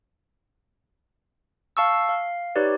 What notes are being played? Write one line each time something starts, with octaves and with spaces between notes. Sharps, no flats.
F5 A5 C#6 E6
F5
D#4 G4 B4 C#5 D5